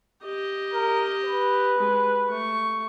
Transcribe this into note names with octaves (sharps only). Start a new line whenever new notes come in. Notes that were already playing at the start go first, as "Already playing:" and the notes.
G4 D#5
A#4
B4
G#3
A3 C#6